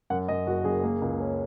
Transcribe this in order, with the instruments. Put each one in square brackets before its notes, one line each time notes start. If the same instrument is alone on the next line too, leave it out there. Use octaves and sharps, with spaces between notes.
[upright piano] F#2 F#5
F#2 D#5
F#1 F#4
F#1 G#4
A#3
C#2
C#4